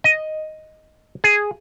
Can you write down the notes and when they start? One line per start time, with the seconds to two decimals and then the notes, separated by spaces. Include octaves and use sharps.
0.04 D#5
1.24 G#4